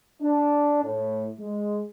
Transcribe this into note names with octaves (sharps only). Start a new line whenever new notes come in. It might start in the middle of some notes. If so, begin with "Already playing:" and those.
D4
A2
G#3